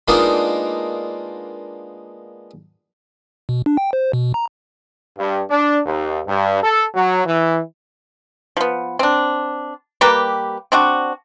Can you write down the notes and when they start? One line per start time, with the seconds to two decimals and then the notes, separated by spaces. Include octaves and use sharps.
0.08 G#3 A#3 B3 D4 D#4 F4
3.49 B2
3.66 D4
3.77 G5
3.93 C5
4.13 B2
4.34 A#5
5.18 G2
5.50 D4
5.86 D#2
6.27 G2
6.63 A4
6.95 F#3
7.26 E3
8.57 F3 B3
8.99 C4 D4
10.01 G3 A#3 G4 B4
10.72 C4 D4 F#4